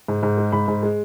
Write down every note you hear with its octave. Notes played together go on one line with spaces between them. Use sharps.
G#2
G#2
G#3
G#2 B5
G#2
G#3